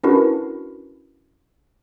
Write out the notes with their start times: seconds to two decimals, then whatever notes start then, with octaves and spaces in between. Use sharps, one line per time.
0.04 C#4 D4 E4 F#4 A#4 B4